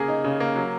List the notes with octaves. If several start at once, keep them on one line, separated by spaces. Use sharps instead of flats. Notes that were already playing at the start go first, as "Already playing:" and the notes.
Already playing: C#3 A#3 G#4
D#4
C#3
A#3
F#3